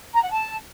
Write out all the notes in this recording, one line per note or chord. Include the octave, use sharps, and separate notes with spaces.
A#5
F#5
A5